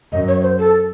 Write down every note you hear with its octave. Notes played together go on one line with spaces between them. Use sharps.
F#2 D#5
C#5
C5
A4